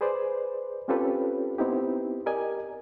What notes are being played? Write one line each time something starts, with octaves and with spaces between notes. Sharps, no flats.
G#4 B4 C5 D5
C4 C#4 F4 G4 A4 B4
B3 C4 D#4 E4 G4
G4 A#4 D5 D#5 G#5